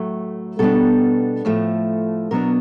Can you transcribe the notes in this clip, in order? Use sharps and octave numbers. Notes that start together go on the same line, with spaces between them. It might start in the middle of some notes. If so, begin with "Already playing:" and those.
Already playing: A2 F#3 A3
B2 G3 B3 D4 A4
A2 F3 A3
B2 F#3 B3 D4 A#4